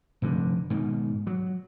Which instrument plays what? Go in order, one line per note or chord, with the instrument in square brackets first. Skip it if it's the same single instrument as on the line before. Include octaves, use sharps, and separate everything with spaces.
[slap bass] F1 G2 D3
G#2 B2 D#3
F#3